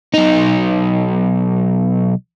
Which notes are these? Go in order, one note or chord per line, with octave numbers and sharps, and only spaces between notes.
B1 D#4